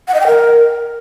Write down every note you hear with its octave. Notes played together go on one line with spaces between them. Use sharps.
F#5
D#5
G5
A#4